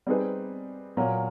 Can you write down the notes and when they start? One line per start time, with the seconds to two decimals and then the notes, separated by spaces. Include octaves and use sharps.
0.07 G3 C4 D#4 G#4 B4
0.97 A#2 F#3 A#3